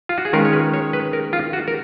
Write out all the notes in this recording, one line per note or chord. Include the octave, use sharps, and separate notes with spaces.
F4
F#4
G#4
D#3 G#3 C#4 F4 A#4
C#5
B4
C#5
B4
A#4
F4
F#4
A#4